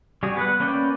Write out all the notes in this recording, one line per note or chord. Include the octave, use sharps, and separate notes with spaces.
G3 F#4 G#4
B3 B4 F#5
A#3 C#4 B4 D5 G5